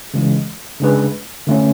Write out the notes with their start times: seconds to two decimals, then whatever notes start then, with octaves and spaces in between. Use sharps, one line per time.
0.14 C#3 E3 G#3
0.80 C#3 G#3 D4 G#4 B4
1.47 D3 A3 C#4